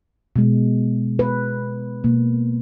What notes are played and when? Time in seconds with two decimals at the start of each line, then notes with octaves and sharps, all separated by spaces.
0.36 B2 G#3
1.19 B4
2.04 B2 A#3